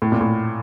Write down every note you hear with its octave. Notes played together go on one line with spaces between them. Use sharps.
A2
A#2
A2